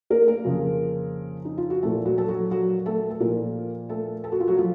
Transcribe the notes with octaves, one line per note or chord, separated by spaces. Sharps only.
A#3 A#4
A#3 A#4
F2 C#3 F3
D#4
F4
F#4
A#2 F3 A3 A4
F#3 F#4
A4
F#3 F#4
F#3 F#4
A3 A4
A4
A#2 F3 A#3 A#4
A3 A4
A4
F#4
F4
F#3 F#4
F3 F4